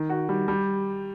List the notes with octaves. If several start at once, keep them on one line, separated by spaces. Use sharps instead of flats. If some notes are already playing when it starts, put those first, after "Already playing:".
Already playing: D#3
F#4
G3
G3